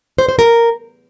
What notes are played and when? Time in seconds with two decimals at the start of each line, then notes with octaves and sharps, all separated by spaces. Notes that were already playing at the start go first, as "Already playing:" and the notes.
0.18 C5
0.29 C5
0.39 A#4